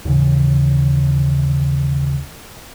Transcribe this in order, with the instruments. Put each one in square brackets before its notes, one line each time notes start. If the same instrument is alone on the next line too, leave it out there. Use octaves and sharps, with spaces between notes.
[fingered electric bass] D#2 A2 C#3 E3